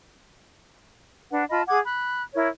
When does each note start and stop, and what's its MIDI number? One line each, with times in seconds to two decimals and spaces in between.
1.30 1.43 62
1.30 1.43 71
1.30 1.43 78
1.50 1.62 65
1.50 1.62 75
1.50 1.62 81
1.50 1.62 83
1.68 1.79 68
1.68 1.79 78
1.68 1.79 86
1.68 1.79 92
1.83 2.22 83
1.83 2.22 90
2.34 2.47 64
2.34 2.47 70
2.34 2.47 73